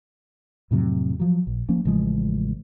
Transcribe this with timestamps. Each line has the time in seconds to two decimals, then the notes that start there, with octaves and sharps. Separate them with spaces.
0.71 F2 A2 C3 F#3
1.20 F3 F#3
1.47 A#1
1.69 F3 A#3 C#4
1.85 A1 C#3 F3 G#3